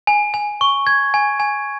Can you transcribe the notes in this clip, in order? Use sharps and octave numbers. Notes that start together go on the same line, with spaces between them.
G#5
G#5
C#6
G#6
G#5
G#5